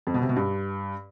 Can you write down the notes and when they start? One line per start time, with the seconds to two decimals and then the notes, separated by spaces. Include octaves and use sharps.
0.07 F2
0.14 B2
0.22 C3
0.29 B2
0.36 G2